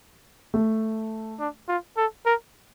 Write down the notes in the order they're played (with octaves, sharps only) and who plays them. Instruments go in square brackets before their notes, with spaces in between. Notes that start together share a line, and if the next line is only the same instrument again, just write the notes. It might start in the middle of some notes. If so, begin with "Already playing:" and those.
[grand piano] A3
[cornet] D4
F4
A4
A#4